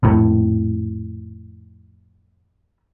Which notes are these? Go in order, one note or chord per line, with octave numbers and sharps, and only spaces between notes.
A#1 F2 A2